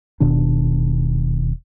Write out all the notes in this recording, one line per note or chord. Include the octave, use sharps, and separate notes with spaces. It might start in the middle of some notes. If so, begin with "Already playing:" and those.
D#1 B2 D#3 D4